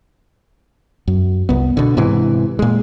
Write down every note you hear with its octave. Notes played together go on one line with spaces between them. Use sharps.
F#2
C2 B3
B2 D3
G#2 C3 E3
A#2 G#3